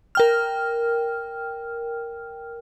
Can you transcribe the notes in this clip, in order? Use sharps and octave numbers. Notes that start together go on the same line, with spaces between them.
A#4 G5 F6